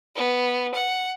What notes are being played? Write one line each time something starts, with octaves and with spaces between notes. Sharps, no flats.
B3
F#5